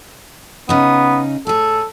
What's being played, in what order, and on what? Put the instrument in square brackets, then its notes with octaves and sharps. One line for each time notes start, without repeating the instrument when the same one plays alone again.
[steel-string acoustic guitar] C#3 D#4 [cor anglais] B3
[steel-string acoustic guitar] A2 G#4 [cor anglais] A4